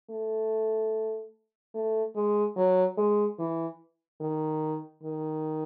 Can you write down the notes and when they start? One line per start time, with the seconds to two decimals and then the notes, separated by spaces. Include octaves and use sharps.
0.10 A3
1.74 A3
2.15 G#3
2.56 F#3
2.97 G#3
3.39 E3
4.21 D#3
5.03 D#3